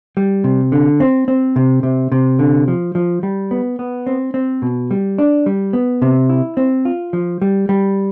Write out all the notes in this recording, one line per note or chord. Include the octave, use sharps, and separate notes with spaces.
G3
C3
D3
C4
C4
C3
C3
C3
D3
F3
F3
G3
B3
B3
C4
C4
B2
G3
D4
G3
B3
C3
E4
C4
F4
F3
G3
G3